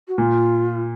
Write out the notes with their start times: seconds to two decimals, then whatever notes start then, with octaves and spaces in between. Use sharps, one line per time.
0.08 F#4
0.18 A#2 F4